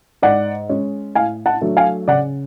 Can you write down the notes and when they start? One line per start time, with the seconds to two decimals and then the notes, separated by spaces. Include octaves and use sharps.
0.22 G#2 D5 F#5
0.69 G#3 C#4
1.15 A2 F5 G#5
1.46 F#5 A5
1.62 F#3 A3 D4
1.77 F5 G#5
2.08 C#3 D5 F#5